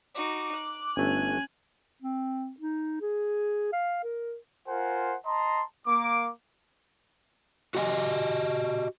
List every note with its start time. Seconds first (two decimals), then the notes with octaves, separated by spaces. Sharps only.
0.15 D#4 F#4 D6
0.55 F#6
0.97 G1 A3 C#4 G#5
2.02 C4
2.60 D#4
3.02 G#4
3.73 F5
4.04 A#4
4.68 F4 A#4 C5 F#5 G#5
5.26 D#5 A5 A#5 C6
5.87 A#3 D6
7.75 F#4 G4 D#5 E5 G#5